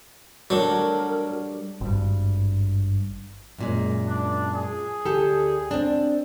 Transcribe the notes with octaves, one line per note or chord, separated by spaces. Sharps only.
F#3 G3 A3 D4 A#4
G#1 G2
F#2 A#2 G#3
D4
G#4
D2 G4 A4
C4 D4